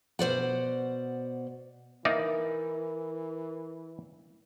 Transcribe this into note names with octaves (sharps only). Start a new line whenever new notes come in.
B2 C5 D5 F#5
E3 A#3 D#4 A#4 D5 E5